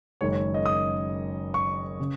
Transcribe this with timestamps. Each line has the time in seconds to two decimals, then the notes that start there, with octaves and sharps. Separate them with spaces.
0.21 F#1 F#2 D#3 G#3 C#5
0.32 C#5
0.54 D#5
0.65 D#6
1.54 C#6
2.00 C#3